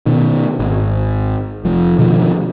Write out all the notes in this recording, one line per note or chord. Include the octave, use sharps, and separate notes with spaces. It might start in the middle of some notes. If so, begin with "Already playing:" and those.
B2 D#3
G#1
F1 F3
B2 D3 D#3 F3